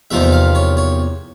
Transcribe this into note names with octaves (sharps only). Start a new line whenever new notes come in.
E2 C3 F3 A#3 D#4 E5
F5
C#5
C#5